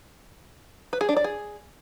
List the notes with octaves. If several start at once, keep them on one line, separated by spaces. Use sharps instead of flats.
B4
G#4
D4
D5
G#4